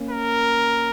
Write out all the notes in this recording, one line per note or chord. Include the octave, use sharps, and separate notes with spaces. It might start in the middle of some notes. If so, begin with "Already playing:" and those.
Already playing: A#3 C#4
A#4